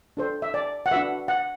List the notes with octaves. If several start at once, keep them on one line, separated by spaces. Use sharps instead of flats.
D4 A4 C5
E5
D5
F#5
D4 F#4 B4 E5
F#5